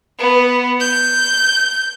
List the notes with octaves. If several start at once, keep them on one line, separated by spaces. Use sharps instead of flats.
B3
G6